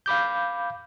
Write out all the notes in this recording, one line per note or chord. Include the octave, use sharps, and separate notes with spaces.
F5 B5 D6 G6